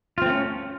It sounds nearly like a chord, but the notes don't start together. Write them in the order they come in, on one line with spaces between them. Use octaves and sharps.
F4 C4 A3 C#4